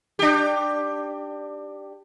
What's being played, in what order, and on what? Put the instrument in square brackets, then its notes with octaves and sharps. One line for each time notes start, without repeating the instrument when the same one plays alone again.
[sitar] D4 G4